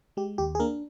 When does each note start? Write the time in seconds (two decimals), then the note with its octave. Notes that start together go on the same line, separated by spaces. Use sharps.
0.17 G#3 G4
0.38 D#2 G4
0.55 G#4
0.60 A#3 D4 A#4